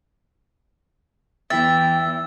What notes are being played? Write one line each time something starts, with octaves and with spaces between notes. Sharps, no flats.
E2 E3 E5 G5 A6